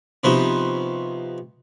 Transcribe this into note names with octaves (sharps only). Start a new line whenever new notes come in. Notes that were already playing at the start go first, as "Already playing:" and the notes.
C3 F3 B3 D#4 F#4